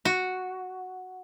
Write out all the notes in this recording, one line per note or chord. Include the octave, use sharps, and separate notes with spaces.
F#4